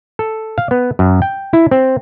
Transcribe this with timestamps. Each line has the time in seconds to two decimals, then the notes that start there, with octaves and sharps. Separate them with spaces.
0.19 A4
0.58 F5
0.71 B3
0.99 F#2
1.22 G5
1.53 E4
1.71 C4